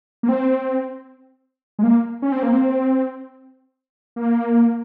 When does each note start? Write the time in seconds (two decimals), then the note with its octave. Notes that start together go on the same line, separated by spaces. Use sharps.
0.23 A#3
0.29 C4
1.79 G#3
1.83 A#3
2.22 C#4
2.32 C4
2.43 A#3
2.53 C4
4.16 A#3